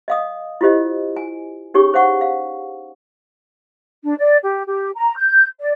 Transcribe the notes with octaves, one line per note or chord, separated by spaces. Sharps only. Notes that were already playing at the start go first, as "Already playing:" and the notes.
D#5 F5 D#6
E4 F4 G4 C5 D#5
G#5
C#4 D#4 G4 G#4 C#5 C#6
C5 F5 F#5 C#6
F5
D4
D5
G4
G4
A#5
G6
D5